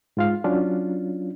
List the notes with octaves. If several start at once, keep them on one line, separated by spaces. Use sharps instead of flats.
G#2 F4 F5
F#3 C#4 D4 F4